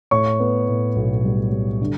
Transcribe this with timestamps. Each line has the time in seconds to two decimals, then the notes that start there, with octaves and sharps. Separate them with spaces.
0.11 A2 C#5 C#6
0.40 B3
0.68 A2
0.96 B1
1.24 G3
1.52 G3
1.81 D3